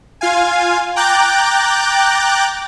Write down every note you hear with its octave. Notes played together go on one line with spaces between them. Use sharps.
F4 F5 G#5
G5 A#5 D6 F#6 G6 A6